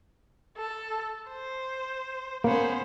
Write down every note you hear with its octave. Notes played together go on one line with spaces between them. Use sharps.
A4
C5
A#3 B3 C#4 C5